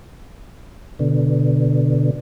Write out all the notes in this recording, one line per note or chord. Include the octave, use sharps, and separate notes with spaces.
B2 D3